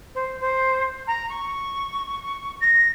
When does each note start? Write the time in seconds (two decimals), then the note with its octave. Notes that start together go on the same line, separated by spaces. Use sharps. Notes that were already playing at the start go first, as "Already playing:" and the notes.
0.14 C5
0.40 C5
1.07 A#5
1.29 C#6
2.60 A#6